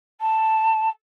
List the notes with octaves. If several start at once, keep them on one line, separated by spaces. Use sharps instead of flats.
A5